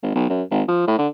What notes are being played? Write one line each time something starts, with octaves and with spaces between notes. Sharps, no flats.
G#1
B1
F#2
G#1
F3
A2
D3